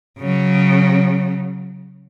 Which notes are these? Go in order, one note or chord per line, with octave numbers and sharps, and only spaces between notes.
C#3 F#3